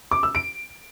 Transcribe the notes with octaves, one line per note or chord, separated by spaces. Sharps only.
D6
E6
D7